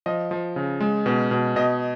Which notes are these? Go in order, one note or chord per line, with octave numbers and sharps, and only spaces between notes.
F3 D#5
F3
C#3
G#3
B2
B2
B2 D#5